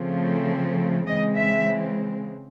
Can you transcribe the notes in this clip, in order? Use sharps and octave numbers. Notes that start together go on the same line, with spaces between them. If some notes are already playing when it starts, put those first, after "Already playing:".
Already playing: C#3 F3 A3 C4
C#3 E3 G#3 C4 D#5
E5